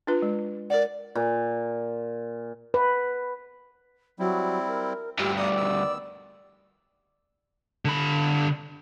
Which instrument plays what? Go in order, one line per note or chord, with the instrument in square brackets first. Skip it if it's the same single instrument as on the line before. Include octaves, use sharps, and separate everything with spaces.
[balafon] D4 F4 B4
G#3
[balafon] A#4 F#5 [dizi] D5
[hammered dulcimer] A#2
[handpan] B4
[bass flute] F#3 [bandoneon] G3 C4 E4
[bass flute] A#4
[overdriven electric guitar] D2 G2 [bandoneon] A#2 E6 [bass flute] G4
[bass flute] D5 [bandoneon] F#5 A#5 D#6
[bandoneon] D#3 B3 E6
[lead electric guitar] D3 B5